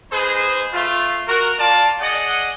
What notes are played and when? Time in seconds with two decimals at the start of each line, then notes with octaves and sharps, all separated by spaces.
0.11 G#3 D#4 G#4 B4 C5
0.72 A3 F4
1.28 F#4 A#4
1.59 F4 D5 A5
2.01 G#4 D5 D#5 F#5